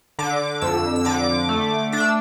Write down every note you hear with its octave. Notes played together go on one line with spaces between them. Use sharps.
D3 D6
F2 E6
E6
D3 D6
A3
D4 D6
E6